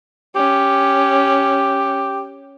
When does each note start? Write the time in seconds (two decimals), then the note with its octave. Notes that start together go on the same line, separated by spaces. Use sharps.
0.36 C#4 G4